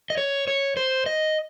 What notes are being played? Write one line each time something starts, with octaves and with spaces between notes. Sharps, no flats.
D#5
C#5
C#5
C5
D#5